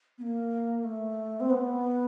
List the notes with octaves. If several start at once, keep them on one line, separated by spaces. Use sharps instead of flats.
B3
A#3
A3
C4
B3